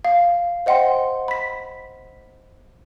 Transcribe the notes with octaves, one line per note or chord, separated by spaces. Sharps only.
F5
C5 D#5 F#5 G5 C6
B5 B6